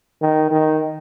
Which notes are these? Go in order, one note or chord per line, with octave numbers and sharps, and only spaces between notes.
D#3
D#3